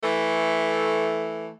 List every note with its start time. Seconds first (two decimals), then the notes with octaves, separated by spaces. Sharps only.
0.04 E3 A3